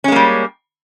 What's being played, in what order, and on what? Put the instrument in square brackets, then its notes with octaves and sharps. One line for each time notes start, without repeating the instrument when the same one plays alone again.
[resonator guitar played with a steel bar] C#4
G#3
A#3
G3